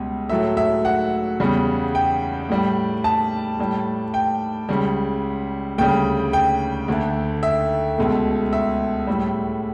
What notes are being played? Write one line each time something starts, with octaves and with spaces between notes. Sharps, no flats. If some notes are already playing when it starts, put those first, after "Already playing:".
Already playing: C#2 B2 G3
A2 F#3 A3 E5
E5
F#5
E2 C#3 G3
G5
A2 G3
A5
A2 G3
G5
C#2 C#3 G3
D2 C#3 G3 G5
G5
D2 D3 A3
E5
C#2 B2 A3
E5
A2 G3